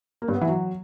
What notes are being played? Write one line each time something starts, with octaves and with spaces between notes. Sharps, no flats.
A#3
G2
B3
E3
F#3